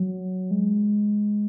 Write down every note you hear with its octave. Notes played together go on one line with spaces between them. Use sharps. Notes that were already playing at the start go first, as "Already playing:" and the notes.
Already playing: F#3
G#3